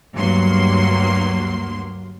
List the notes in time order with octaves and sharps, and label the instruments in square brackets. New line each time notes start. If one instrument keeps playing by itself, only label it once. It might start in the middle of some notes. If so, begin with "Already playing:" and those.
[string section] D2 G2 F#3 A#3 C6